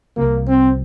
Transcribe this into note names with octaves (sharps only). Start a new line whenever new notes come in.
C2 C3 F3 A#3
C4